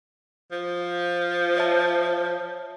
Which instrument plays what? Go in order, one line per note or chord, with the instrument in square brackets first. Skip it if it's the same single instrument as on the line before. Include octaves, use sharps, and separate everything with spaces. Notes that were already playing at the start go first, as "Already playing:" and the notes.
[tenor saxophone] F3
[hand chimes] C#5 E5 A5